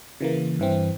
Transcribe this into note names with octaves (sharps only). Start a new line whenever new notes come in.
C#3 E3 A#3
G2 E3 C4